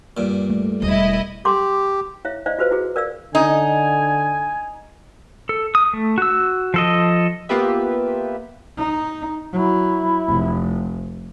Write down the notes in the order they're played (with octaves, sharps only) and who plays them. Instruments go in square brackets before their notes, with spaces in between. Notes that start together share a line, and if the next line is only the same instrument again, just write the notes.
[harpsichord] G2 A#2
[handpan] A3
[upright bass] E1 G3 [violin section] E4 D#5
[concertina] G4 [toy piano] C6 D6
[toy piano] E4 C#5 E5 F5
E4 C5 D5 D#5 F5
F4 F#4 B4 C5 F5
E4 F#4 G#4
A#4 D5 F5 E6
[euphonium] D3 [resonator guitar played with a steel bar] D#4 [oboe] G#5
[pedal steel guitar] A4
D#6
A3
F#4 E6
F3 A4 D#5
[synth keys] A#3 B3 F4 G4 B4 E5
[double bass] D#4
[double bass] F#3 [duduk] E4
[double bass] F1